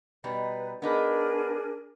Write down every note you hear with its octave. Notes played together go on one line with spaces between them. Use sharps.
B2 G3 D#4 B4
B3 D4 D#4 G#4 A#4 B4